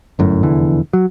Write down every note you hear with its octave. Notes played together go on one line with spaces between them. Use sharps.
G1 F#2 A2
F1 E2 D3 E3
F#3